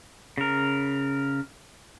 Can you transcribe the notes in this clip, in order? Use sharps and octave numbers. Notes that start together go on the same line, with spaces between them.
C#3 A#4